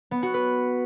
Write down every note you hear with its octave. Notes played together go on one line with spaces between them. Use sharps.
B3
F#4
B4